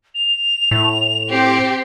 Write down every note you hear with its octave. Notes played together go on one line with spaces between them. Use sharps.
F7
A2
C4 G4 C7